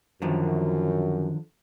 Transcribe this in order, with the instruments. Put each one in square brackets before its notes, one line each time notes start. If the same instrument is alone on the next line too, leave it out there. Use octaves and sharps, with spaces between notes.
[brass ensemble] F#2 [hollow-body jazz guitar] D3 D#3 F3